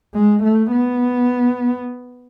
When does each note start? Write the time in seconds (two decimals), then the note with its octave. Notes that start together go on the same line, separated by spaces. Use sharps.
0.14 G#3
0.43 A3
0.71 B3